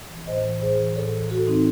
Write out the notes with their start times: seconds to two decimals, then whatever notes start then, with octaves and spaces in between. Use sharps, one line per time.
0.10 E3
0.27 A2 C5 D#5
0.45 E3
0.61 A2 G#4 C5
0.79 E3
0.96 A2 A4 C#5
1.13 E3
1.30 A2 F#4 A4
1.47 E3 C4 D#4